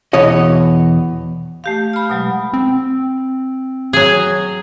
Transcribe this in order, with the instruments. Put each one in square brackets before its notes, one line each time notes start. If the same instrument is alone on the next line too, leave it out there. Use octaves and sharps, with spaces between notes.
[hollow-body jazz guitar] E2 B2 C#5 D#5
[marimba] A3 G4 F5
B5 F6
B2 F#3 G#3
[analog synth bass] C4
[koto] F#3 G#4